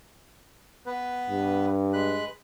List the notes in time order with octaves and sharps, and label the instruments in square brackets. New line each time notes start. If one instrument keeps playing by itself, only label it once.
[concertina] B3 B4
[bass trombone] G2
[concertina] G#3 B4 F#6